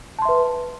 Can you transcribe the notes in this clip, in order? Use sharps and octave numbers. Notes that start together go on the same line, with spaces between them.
B4 E5 A5 C6